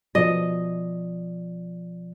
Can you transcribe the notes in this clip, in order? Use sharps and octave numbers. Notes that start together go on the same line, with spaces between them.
B2 F3 D5 D#5